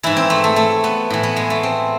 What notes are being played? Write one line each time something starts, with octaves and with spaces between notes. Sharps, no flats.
G#2 E3 E4
C4
A3
A3
A3
B3
A2 E3
B3
G#3
A3
C4